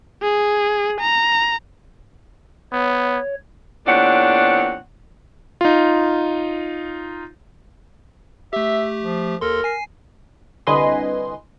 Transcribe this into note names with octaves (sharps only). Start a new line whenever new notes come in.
G#4
A#5
B3 C#5
E2 A#2 C4 D4 C#5 F#5
D#4 F4
A3 G4 E5
F3
D#2 A4 A#4 C6
G#5 C7
C2 D3 B4 D#5 G#5 C6